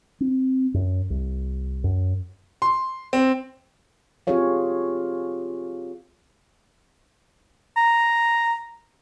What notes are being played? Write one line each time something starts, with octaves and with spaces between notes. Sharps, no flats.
C4
F#2
C2
F#2
C6
C4
C4 F4 G4 G#4 C#5 F5
A#5